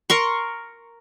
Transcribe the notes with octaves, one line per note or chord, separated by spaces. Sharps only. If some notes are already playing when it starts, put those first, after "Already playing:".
A#4 C6 C#6